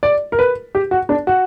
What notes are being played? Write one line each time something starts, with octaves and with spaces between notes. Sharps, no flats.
D5
A#4
B4
G4
F#4
D4
F#4